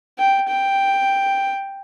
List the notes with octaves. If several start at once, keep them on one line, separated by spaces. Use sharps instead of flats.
G5
G5